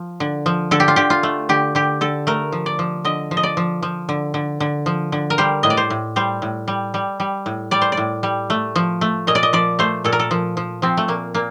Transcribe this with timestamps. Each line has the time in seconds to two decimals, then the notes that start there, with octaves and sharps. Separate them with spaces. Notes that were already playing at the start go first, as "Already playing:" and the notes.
Already playing: F3
0.20 D3
0.46 F3
0.71 D3 A4
0.80 G4
0.88 F4
0.96 D3 G4
1.10 F4
1.23 A3
1.49 D3 G4
1.75 D3 G4
2.01 D3 A4
2.27 A3 A#4
2.52 F3
2.66 D5
2.79 F3
3.05 D3 D#5
3.31 F3
3.37 D#5
3.43 D5
3.57 F3
3.82 F3
4.09 D3
4.34 D3
4.60 D3
4.86 F3
5.12 D3
5.30 A#4
5.38 G3 C5
5.63 A2 D#5
5.70 D5
5.77 C5
5.90 A2
6.16 G3 C5
6.42 A2
6.68 G3
6.94 G3
7.20 G3
7.46 A2
7.71 G3 D5
7.82 C5
7.92 D5
7.97 A2
8.23 G3
8.50 A3
8.75 F3
9.01 A3
9.27 A#2 D#5
9.35 D5
9.43 D#5
9.53 F3 D5
9.79 A3 C5
10.04 A#2 A4
10.12 A#4
10.19 A4
10.31 F3
10.57 F3
10.82 F3 C4
10.97 A3
11.08 A#2 A#3
11.34 A#2 A#3